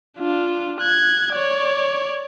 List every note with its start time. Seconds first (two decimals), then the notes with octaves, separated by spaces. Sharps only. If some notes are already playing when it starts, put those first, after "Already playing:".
0.18 D4 F4
0.81 F#6 G#6
1.33 C#5 D5